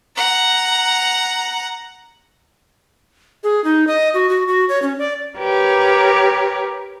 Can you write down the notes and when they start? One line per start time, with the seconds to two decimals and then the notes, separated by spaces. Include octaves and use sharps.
0.16 F#5 A#5
3.44 G#4
3.64 D#4
3.87 D#5
4.14 F#4
4.29 F#4
4.48 F#4
4.69 C#5
4.82 C#4
4.99 D5
5.37 G4 A#4 B4 C#5